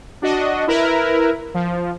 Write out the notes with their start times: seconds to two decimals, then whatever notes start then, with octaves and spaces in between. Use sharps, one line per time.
0.22 D4 F#4 D#5
0.68 E4 A#4 B4
1.54 F3